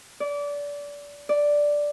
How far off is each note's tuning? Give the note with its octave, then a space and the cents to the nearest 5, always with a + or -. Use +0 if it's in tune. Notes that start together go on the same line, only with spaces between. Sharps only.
D5 -25
D5 +0